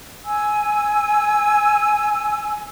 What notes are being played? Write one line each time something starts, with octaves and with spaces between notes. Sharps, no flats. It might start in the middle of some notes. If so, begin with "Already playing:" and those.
G#5 E6